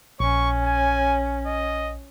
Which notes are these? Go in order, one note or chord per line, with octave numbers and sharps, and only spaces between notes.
A#1 C#4 C#6
G#5
D#5